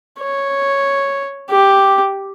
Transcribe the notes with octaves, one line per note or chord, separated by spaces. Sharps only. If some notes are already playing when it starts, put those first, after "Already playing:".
C#5
G4